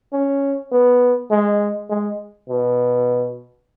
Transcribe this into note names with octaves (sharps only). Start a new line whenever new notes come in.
C#4
B3
G#3
G#3
B2